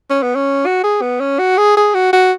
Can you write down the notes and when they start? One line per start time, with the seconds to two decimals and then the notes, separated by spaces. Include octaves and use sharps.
0.10 C#4
0.22 B3
0.35 C#4
0.66 F#4
0.83 G#4
1.02 B3
1.20 C#4
1.39 F#4
1.57 G#4
1.77 G#4
1.94 F#4
2.13 F#4